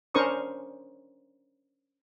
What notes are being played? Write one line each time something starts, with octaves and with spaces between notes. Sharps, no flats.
C#4 D4 A#4 C5 C#6 D#6